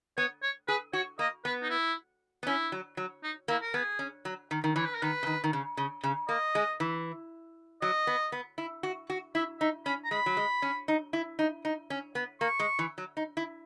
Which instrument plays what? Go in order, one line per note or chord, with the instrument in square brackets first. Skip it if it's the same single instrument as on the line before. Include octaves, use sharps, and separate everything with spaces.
[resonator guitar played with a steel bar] B3 [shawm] C#5
[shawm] C#5
[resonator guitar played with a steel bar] G#4 [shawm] B4
[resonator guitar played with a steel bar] F#4 [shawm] C#5
[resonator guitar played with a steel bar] A#3 [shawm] D#5
[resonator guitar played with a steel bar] B3 [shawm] B4
[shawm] D#4
E4
[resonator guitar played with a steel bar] B3
[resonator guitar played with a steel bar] C#4 [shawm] E4
[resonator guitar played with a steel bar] F#3
F#3
[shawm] D#4
[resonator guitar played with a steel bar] A#3 [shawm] E4
[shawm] A#4
[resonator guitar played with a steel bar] B3 [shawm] G#4
[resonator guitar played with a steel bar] C#4
F#3
D#3
D#3
[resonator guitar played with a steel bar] E3 [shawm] C#5
[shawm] B4
A#4
[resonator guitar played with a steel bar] D#3 [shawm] B4
[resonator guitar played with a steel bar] C#3
D#3
D#3
C#3
C#3
C#3
[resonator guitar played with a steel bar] A#3 [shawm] D#5
[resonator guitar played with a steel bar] G#3
E3
[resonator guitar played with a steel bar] F#3 [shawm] D#5
[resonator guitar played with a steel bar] B3
B3
E4
F#4
F#4
[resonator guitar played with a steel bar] E4 [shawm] E5
[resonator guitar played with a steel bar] D#4 [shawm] E5
[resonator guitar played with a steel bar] C#4 [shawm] B5
[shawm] A#5
[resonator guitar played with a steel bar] G#3 [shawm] B5
[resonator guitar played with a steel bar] F#3
G#3
C#4
D#4
E4
D#4
D#4
C#4
B3
[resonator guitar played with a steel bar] A#3 [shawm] C#6
[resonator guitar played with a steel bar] G#3
E3
F#3
D#4
E4